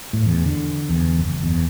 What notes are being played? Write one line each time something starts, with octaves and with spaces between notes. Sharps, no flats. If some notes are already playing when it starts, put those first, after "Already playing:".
A2
E2
D3
E2
F#1
E2